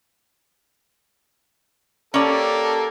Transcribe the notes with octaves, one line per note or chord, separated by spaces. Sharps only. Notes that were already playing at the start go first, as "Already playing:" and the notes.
A#3 C#4 G4 A4 D5